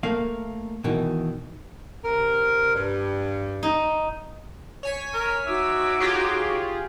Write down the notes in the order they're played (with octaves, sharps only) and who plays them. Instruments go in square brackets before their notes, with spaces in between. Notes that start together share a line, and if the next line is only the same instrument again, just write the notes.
[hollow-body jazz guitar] A3 A#3 F5
B2 D#3 E3
[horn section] C3 A#4
G2
[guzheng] D#4
[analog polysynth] C#5 G#5 B6
[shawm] A#4
[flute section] D#4 F#4 D6 [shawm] E5
[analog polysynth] F4 G4 G#4 [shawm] C#5